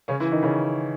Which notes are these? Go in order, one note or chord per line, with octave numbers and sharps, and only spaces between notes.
C#3 C#4
E3 E4
D#3 D#4
C#3 C#4